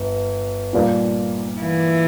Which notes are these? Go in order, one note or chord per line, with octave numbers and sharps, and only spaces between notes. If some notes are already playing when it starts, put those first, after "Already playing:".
Already playing: G1
A#2 G3 D4 F4 A#4
E3